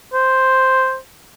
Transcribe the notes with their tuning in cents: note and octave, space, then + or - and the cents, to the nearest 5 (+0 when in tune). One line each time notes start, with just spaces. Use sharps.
C5 +0